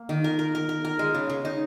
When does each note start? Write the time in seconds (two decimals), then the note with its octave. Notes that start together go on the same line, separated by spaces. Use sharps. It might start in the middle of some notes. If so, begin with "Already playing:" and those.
Already playing: A#3
0.09 D#3
0.24 A#4
0.39 A#4
0.55 A#4
0.69 A#4
0.85 A#4
0.99 G#3
1.15 C#3
1.30 C#3
1.45 D#4